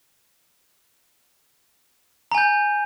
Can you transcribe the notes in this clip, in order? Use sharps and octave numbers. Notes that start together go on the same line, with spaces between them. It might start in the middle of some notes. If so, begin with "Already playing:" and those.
G#5 A#5 G6